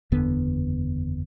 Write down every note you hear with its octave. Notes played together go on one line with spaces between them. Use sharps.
F#1 E2 D3 B3